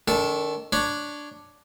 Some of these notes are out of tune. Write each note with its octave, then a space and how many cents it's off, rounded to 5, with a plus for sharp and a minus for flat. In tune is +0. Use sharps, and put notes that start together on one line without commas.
D#3 +0 D4 -45 A4 +0
D4 +0 C#5 +0 B5 +0